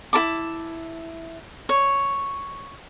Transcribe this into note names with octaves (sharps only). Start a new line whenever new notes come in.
E4 A#4 A5 D6
C#5